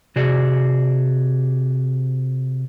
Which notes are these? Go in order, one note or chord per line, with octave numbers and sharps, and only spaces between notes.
C3 F#4 G#4 D5